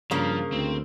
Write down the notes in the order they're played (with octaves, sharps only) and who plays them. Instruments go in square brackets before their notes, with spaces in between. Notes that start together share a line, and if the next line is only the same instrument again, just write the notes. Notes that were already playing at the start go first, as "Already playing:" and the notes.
[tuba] G2 [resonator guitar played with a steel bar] C#3 A#3 [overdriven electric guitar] F3
[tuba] D2 [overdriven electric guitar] C4